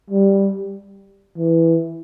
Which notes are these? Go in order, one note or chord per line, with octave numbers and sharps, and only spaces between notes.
G3
E3